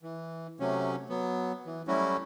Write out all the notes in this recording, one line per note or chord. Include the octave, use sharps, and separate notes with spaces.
E3
C3 F#3 A3 C#4
F#3 B3
E3
F#3 G3 A3 C#4 E4 F#4